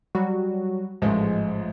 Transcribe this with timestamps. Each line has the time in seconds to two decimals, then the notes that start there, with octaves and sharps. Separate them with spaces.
0.15 F#3 G3 F#4
1.02 A1 G#2 F3 G#3 A3